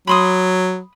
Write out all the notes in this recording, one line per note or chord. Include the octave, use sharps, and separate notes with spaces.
F#3 B5 C6 D#6